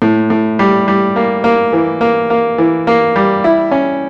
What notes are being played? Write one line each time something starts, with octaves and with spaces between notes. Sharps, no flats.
A2
A2
G3
G3
A#3
A#3
E3
A#3
A#3
E3
A#3
G3
E4
C#4